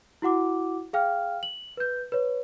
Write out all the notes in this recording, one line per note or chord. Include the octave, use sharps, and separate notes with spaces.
E4 F#4 F#5 D6
G#4 F5 G5 F6
F#7
B4 G6
B4 C#5